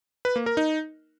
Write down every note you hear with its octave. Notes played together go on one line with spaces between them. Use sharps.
B4
A#3
A#4
D#4